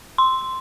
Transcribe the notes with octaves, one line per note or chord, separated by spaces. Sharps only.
C6